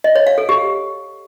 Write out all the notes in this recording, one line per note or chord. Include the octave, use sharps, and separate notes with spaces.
D#5
C#5
F5
A4
G4